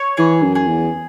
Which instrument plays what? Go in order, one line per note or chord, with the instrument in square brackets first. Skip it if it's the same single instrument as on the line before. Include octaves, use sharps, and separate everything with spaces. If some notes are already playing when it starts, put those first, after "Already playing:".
Already playing: [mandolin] C#5
[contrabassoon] E3 [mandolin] G#4
[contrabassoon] F#2
[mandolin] G#4
[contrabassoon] E2